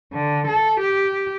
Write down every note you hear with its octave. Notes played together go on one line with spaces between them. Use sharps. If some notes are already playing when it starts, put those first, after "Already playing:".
D3
A4
G4